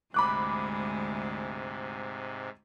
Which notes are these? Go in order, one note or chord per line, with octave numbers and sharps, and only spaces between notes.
D2 G#2 C3 G#3 B5 D6 F#6